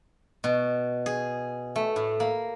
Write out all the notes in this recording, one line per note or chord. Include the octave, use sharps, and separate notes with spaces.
B2
G#4
A3
A2
A#3